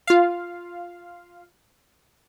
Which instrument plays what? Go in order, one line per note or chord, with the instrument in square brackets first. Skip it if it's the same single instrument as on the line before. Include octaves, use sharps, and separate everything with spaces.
[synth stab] F4 F5